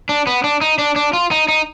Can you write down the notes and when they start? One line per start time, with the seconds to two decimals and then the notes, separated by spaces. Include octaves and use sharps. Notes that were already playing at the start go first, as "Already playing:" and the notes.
0.09 D4
0.27 B3
0.44 D4
0.61 D#4
0.78 D4
0.96 D4
1.13 F4
1.31 D#4
1.48 D#4